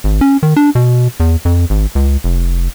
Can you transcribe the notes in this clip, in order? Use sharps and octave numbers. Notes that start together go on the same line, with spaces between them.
G#1
C#4
D#3
D4
B2
E2
F2
G#1
C#2
F1